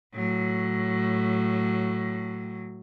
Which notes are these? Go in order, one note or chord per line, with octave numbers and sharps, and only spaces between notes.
A2 F#3